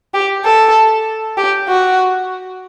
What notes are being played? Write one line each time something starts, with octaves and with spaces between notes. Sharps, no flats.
G4
A4
G4
F#4